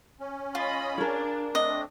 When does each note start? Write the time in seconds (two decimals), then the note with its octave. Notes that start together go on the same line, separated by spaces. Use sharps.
0.20 C#4
0.55 F4 D#5 B5
0.98 D4 G#4 A#4
1.55 A3 C4 D4 D#5